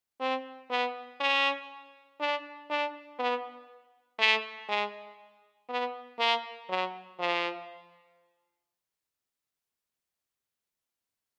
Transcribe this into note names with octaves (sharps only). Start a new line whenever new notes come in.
C4
B3
C#4
D4
D4
B3
A3
G#3
B3
A#3
F#3
F3